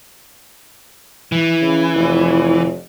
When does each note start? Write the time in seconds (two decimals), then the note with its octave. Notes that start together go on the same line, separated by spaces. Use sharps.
1.32 E3
1.62 C#3
1.95 F1